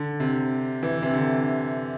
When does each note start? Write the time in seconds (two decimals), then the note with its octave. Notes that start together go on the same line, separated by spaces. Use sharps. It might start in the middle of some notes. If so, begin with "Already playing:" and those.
Already playing: D3
0.20 C3
0.83 E3
1.02 C3
1.13 D3